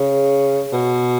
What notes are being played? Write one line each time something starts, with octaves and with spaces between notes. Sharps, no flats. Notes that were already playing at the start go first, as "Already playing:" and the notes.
Already playing: C#3
B2